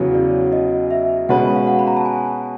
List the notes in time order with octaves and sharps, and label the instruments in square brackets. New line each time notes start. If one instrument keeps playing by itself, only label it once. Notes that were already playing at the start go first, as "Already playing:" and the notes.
Already playing: [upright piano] E2 C#3 F#3 B3 [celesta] C#5
[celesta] D5
D#5
E5
[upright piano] B2 G#3 C#4 F#4 B4 [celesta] F#5
[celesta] F5
F#5
B5
A#5
A5
G#5